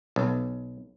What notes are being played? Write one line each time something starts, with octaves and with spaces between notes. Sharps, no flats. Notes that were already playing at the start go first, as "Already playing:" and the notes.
B1